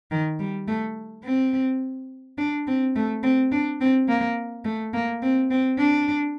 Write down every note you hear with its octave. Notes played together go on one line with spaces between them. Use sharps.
D#3
G3
A3
C4
D4
C4
A3
C4
D4
C4
A#3
A3
A#3
C4
C4
D4